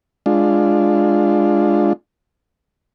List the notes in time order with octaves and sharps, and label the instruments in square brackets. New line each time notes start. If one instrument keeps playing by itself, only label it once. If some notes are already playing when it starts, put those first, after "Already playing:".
[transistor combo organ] G#3 D4 F4